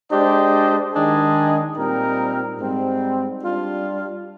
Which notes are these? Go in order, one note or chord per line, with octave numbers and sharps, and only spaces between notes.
G#3 D4 G4 C5 D#5
D#3 G#3 D4 G#4 D#5
A#2 G3 C4 D#4 A#4
G#2 G3 C4
G3 D4 F4